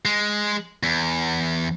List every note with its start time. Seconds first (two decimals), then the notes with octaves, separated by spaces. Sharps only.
0.05 G#3
0.83 E2